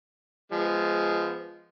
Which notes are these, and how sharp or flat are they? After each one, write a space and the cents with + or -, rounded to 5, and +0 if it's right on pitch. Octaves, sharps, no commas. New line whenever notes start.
F3 -15 G#3 -5 B3 +0